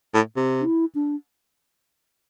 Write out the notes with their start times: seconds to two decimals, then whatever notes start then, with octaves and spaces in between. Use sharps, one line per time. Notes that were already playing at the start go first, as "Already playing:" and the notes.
0.14 A2
0.36 C3
0.61 D4
0.65 E4
0.95 D4